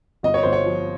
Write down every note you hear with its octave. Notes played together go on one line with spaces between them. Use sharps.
G1 D#5
C#5
G1 C5
C#5
F3